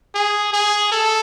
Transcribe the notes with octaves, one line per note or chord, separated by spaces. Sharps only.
G#4
G#4
A4